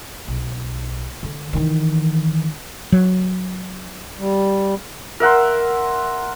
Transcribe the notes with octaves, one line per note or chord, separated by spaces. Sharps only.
B1
D3
D#3 E3
F#3
G3
A#4 E5 F#5 C6